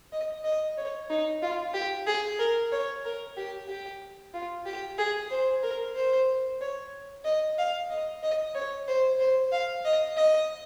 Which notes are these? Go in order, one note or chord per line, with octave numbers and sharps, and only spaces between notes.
D#5
D#5
C#5
D#4
F4
G4
G#4
A#4
C#5
A#4
G4
G4
F4
G4
G#4
C5
A#4
C5
C#5
D#5
F5
D#5
D#5
C#5
C5
C5
F5
D#5
D#5